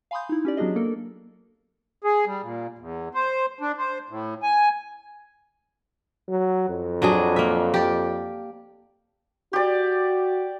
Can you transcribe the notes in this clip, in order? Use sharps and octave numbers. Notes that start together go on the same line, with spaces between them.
F5 G#5 B5 C6 D#6 G6
D#4 E4
C#4 G4 D5
F#3 B3 D4 F#4 G#4 D#5
A#3 A4 A#4
G#4
G3
A#2
E2
C5
D4
C5
A2
G#5
F#3
F2
F#3 D4 G#4
A#3 E5
G4 D5
F#4 G4 D5